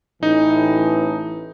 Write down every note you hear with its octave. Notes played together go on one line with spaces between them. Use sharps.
A1 A2 E3 D#4